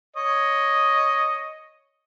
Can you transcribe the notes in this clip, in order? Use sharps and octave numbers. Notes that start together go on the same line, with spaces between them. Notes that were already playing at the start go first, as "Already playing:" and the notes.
C#5 D#5